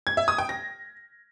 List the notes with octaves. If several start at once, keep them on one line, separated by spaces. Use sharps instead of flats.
G#6
E5
D#6
G5
A#6